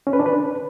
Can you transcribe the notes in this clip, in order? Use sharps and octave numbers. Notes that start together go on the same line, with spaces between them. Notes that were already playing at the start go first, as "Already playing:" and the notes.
C#4
B4
D4
B4